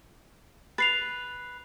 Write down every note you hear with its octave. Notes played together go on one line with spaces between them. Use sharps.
B4 A6 C7 F7